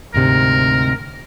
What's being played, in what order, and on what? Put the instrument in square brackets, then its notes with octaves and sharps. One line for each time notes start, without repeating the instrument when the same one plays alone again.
[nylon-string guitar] D2 G#2 C3 [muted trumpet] A#4